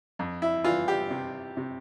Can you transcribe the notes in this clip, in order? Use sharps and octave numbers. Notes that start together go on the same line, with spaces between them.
F2
E4
E3 F4
G4
C3
C3